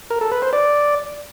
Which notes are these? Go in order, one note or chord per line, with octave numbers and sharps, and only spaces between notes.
A#4
A4
B4
C5
D5